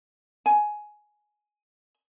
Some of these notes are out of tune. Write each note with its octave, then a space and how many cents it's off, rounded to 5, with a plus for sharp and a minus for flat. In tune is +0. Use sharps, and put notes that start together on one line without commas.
G#5 +15